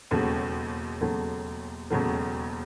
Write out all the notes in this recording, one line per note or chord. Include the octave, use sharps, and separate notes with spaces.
E1 D#2 C#3 F#3 A3
E1 D#2 C#3 F#3 A3
E1 D#2 C#3 F#3 A3